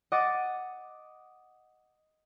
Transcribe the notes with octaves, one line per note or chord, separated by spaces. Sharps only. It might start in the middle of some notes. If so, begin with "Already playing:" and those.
D#5 F#5 D6 D#6 A6